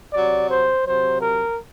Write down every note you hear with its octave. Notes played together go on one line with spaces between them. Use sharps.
C3 F#3 D5
C5
C3 F#3 C5
A#4